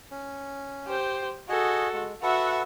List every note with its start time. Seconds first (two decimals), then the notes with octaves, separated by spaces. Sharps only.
0.11 C#4
0.88 G4 C5
1.49 F#4 G#4 A4 D#5
1.93 G#3
2.23 F#4 A4 B4 E5 F#5